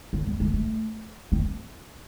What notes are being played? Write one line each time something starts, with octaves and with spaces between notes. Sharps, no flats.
F#3
G3
G#3
A3
C4